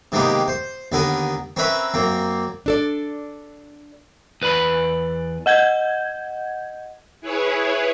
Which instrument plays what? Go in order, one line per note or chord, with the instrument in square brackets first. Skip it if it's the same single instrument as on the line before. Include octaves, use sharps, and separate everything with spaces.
[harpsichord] C3 D#3 G#3 A#3 B3 G4
C5
D#2 D3 B3 A#4 G#5
C4 C#4 A#4 B4 E5 B5
F#2 A#3 C4
[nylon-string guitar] D4 A4 D5
[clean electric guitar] E2 B4 D5 B5
[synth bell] D#5 F#5 G6 G#6
[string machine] E4 G#4 B4 C#5